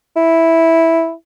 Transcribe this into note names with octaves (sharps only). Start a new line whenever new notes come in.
E4